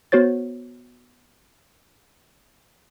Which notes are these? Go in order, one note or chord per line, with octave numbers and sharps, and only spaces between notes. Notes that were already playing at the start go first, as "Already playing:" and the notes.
B3 F#4 C5 C#5 A6